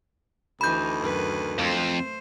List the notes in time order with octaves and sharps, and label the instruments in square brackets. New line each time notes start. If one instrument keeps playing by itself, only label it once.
[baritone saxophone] D2 [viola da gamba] E3 D#4 [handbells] B5 G6
[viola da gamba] F#2 D#3 B4
[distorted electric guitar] F2 [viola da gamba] A3 C5